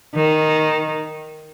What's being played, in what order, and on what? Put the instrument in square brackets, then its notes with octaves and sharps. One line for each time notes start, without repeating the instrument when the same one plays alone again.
[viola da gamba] D#3